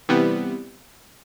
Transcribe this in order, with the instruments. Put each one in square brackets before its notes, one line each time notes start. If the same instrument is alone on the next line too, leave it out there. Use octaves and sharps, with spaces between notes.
[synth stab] C3 E3 G3 B3